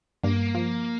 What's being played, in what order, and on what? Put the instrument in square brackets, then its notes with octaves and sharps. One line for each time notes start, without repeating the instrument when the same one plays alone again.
[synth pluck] G2 [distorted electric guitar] A#3
[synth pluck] F3